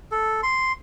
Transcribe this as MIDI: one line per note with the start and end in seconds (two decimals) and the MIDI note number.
0.12 0.41 69
0.43 0.72 84